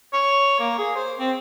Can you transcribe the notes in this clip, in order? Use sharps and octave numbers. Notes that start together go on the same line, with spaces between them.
C#5
A#3
G#4
C5
C4